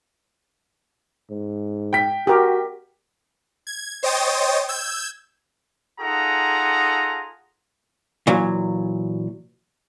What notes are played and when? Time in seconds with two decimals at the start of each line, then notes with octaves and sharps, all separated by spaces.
1.31 G#2
1.93 G5 B6
2.27 F#4 G4 A#4
3.67 G#6
4.03 C5 C#5 D#5 G5 D#6 A6
4.68 E6 G6 G#6
6.01 D#4 F4 G#4 A4 F#5 A#5
8.27 A#2 E3 F#3